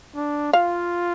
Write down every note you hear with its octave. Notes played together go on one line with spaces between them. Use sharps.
D4
F4 F5